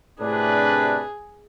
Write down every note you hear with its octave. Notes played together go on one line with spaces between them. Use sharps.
A2 C3 D4 G#4 B4